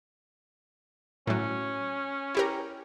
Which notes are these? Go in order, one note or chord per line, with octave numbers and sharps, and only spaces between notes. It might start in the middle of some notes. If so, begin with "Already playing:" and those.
A2 F#3 C#4
E4 G4 A#4